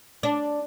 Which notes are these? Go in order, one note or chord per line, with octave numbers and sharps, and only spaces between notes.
D4